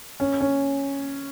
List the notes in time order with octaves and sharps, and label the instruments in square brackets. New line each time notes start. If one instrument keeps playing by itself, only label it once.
[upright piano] C#4
C#4